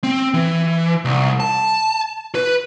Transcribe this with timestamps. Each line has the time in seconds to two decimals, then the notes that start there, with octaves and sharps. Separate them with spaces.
0.04 C4
0.34 E3
1.05 C2
1.40 A5
2.35 B4